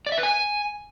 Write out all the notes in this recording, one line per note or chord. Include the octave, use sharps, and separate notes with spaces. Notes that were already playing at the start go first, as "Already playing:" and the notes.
D5
E5
B4
G#5